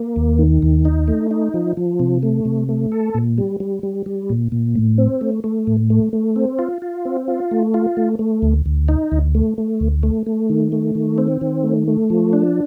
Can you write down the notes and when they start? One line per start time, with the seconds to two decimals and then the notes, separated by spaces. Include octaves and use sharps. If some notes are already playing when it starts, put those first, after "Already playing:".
Already playing: A#3
0.16 D#2
0.39 D#3
0.62 D#2
0.85 D#4
1.08 A3
1.31 D#4
1.54 F3
1.77 F3
1.99 C3
2.23 A3
2.45 C3
2.69 A3
2.92 A4
3.15 A#2
3.38 G3
3.60 G3
3.83 G3
4.06 G3
4.30 A#2
4.52 A#2
4.75 A2
4.98 C4
5.21 A3
5.44 A3
5.67 A2
5.90 A3
6.13 A3
6.36 C4
6.59 F4
6.82 F4
7.05 C4
7.28 F4
7.51 A3
7.74 F4
7.97 A3
8.19 A3
8.42 D2
8.66 D2
8.88 D#4
9.12 D2
9.35 A3
9.58 A3
9.80 D2
10.03 A3
10.26 A3
10.50 D#3
10.72 A3
10.95 D#3
11.18 C4
11.41 D#3
11.64 A3
11.88 A3
12.10 F3
12.33 D4